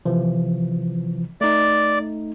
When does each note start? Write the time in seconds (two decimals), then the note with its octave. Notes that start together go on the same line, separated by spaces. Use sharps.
0.05 C3 E3 F3
1.41 A3 D#4 D5